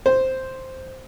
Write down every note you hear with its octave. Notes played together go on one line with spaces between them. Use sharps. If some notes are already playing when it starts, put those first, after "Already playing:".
C5